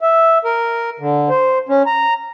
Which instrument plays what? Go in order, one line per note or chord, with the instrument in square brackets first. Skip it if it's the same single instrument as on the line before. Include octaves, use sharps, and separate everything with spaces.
[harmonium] E5
A#4
D3
C5
C#4
A#5